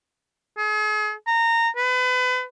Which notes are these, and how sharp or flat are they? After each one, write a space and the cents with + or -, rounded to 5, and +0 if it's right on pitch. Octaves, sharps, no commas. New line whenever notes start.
G#4 +40
A#5 -20
B4 +30